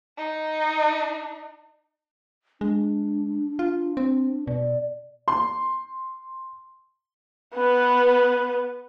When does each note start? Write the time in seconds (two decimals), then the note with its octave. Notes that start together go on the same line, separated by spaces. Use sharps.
0.18 D#4
2.61 G#3 D4
3.59 F4
3.97 C4
4.47 B2 D5
5.28 C6
7.55 B3 B4